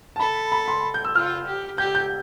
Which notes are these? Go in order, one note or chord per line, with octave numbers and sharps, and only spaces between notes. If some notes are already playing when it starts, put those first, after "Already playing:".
A5
A4 B5
B5
C6
G6
E6
F4 F6
G4
G4 G6
G6